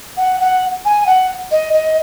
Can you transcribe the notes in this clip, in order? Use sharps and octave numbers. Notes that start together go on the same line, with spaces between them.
F#5
F#5
G#5
F#5
D#5
D#5